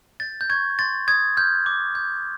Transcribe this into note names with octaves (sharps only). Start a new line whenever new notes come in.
G6 A6
G6
C#6 G#6
C6 A6
D#6 G#6
F6 G6
D6
G6